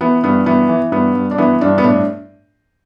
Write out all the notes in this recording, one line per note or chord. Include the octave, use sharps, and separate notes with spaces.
E3 B3
G2 B3
E3 B3
E3
G2 B3
G2
D4
E3 B3
G2 D4
B3
A2 D4